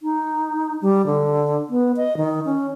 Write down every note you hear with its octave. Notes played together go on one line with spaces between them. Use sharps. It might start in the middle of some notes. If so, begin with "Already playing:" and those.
D#4
G3
D3
B3
D#5
D#3
C#4